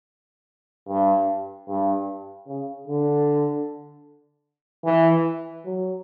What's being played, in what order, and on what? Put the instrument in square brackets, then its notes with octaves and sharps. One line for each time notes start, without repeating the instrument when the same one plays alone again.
[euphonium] G2
G2
C#3
D3
E3
F#3